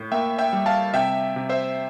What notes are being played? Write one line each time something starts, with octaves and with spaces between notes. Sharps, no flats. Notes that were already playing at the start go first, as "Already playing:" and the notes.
Already playing: A2
A#3 E5 G5
E5 G5
G3
F5 A5
C3 E5 G5
C3
C5 E5